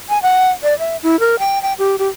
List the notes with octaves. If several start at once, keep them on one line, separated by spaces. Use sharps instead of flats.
G#5
F#5
D5
E5
E4
A#4
G5
G5
G4
G4